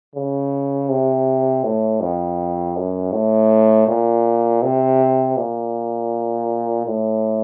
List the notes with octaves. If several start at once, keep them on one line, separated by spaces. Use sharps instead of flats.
C#3
C3
A2
F2
F#2
A2
A#2
C3
A#2
A2